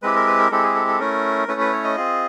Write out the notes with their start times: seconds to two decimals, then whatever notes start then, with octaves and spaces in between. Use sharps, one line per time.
0.03 G#3 C4 E4 G4 B4
0.16 A#4
0.27 B4
0.39 A#4
0.51 G#3 C4 E4 G4 A4
0.63 G#4
0.76 A4
0.88 A4
0.99 A3 C#4 E4 A#4
1.48 A3 C#4 E4 B4
1.60 B4
1.73 C#5
1.84 D#5
1.97 C4 F4 G#4